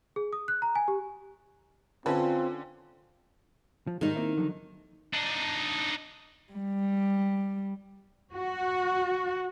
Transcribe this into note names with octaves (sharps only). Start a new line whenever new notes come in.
G#4
D#6
F#6
A#5
G#5
G4
D3 C4 C#4 F4 G#4 A4 B4
F3
G#2 D#3 G3 G#3 D#4
A#3 C4 E4
D3 F3 F#3
D4 D#4
G3
F#4